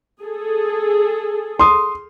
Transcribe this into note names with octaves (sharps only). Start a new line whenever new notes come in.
G#4 A4
C6 D#6